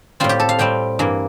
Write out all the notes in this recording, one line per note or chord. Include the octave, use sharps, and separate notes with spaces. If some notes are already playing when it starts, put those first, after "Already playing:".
A2 G3 C4 F4
G4
A4
F5
A2 G3 C4 G5
G2 E3 A#3